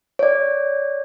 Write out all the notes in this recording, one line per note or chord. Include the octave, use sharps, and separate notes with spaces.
C#5 D5